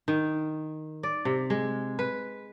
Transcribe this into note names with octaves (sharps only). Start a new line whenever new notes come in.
D#3
D5
C3
G#3
B4